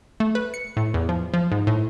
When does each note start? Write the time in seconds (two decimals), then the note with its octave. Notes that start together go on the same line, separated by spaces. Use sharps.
0.20 A3
0.35 B4
0.54 C#7
0.77 A2
0.94 E2
1.09 F3
1.34 F3
1.52 G#2
1.67 A2